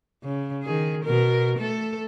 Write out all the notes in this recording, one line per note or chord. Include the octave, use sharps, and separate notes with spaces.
C#3
D#3 G#4
B2 A#4
A3 A4